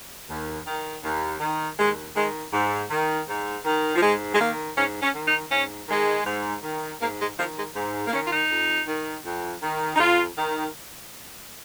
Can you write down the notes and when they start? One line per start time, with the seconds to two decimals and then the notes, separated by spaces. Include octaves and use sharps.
0.28 D#2
0.66 D#3
1.03 D#2
1.40 D#3
1.78 D#2 G#3
2.15 D#3 G#3
2.52 G#2
2.89 D#3
3.27 G#2
3.64 D#3
3.95 F3
4.01 G#2 G#3
4.34 G#3
4.39 D#3 A#3
4.76 G#2 C#4
5.01 C#4
5.14 D#3
5.26 D#4
5.51 G#2 C#4
5.88 D#3 G#3
6.25 G#2
6.63 D#3
7.00 G#2 A#3
7.18 G#3
7.38 D#3 F3
7.56 G#3
7.74 G#2
8.07 A#3
8.12 D#3 C#4
8.25 F4
8.31 D#4
8.50 F2
8.87 D#3
9.24 F2
9.62 D#3
9.95 D#4
9.98 F2 F4
10.36 D#3